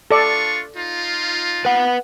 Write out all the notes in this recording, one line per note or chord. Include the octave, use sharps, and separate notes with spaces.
D4 F4 A4 D5 C#6
D#4 F4
B4 F#5